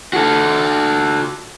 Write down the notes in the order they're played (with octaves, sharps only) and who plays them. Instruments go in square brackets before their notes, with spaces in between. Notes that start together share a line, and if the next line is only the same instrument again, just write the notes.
[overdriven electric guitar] F#4 A4